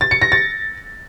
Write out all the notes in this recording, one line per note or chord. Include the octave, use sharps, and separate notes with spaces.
A6
C#7
A#6
A6